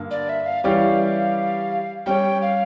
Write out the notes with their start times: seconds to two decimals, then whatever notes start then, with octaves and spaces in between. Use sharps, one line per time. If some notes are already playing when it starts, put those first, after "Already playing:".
Already playing: G2 D3 A#3
0.11 D5
0.29 E5
0.46 F5
0.64 E3 G3 C#4 G4 D5 F5
2.06 G3 C#4 G4 C#5 G5
2.42 F5